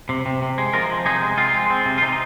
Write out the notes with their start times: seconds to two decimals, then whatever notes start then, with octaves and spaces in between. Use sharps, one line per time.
0.09 C3
0.26 C3
0.42 C3
0.58 G#3
0.74 F3 F4 A#4
0.89 F3
1.06 C3 D#4 G#4
1.21 G#3
1.37 C4 F4
1.54 G#3
1.70 C4
1.86 C3
1.98 F4
2.02 C3 D#4